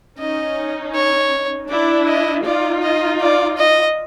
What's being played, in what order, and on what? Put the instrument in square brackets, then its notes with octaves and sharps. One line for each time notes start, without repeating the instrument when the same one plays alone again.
[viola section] C#4 D#4 [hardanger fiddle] D#5
[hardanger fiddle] C#5
[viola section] D4 E4 [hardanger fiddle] D5
[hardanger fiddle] D#5
[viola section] D#4 F4 [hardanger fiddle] D5
[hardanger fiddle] D#5
D5
D#5